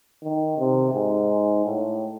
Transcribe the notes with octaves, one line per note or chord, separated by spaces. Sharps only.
D#3
C3
G#2
A2